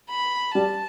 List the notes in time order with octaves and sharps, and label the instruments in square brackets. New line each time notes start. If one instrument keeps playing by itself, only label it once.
[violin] B5
[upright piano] G3 [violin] A5